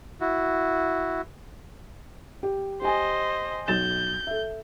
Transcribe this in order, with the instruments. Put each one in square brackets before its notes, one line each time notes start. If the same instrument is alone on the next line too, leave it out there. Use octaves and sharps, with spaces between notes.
[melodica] E4 F#4
[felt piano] G4
[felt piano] G4 G#5 [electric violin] C5 D#5
[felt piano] B1 A6 E7 [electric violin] G6
[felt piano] A4 E5